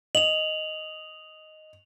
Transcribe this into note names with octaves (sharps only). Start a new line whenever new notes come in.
D#5 F7 F#7